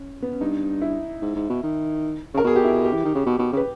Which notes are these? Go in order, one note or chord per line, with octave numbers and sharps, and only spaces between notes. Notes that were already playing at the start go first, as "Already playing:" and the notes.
Already playing: C#4
B3
C#4
G2 D#4
E4
G#2
G#2
B2
D#3
C#3 A#4
B2 G#4
G4
E4
G4
E3
D#3
C#3
B2
B2
C#3 B4